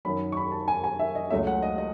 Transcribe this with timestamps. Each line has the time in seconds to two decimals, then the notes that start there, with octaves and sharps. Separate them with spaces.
0.05 F#2 D#3 F#3 B5
0.32 C#6
0.37 B5
0.52 A5
0.68 G#5
0.84 G#5
0.99 E5
1.15 D#5
1.30 C#2 C#3 F#3 A3 C#4 E5
1.47 F#5
1.62 D#5
1.78 D#5